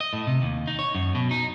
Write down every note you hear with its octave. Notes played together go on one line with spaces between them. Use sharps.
D#5
A2
C3
D#2
D#4
C#5
F#2
B2
D#4